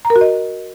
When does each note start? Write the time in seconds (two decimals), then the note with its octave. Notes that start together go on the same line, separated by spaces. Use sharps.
0.05 A#5
0.10 A#4
0.16 F#4
0.21 D#5